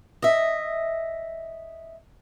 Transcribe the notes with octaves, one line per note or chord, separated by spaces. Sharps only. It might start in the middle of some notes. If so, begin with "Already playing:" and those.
D#5 E5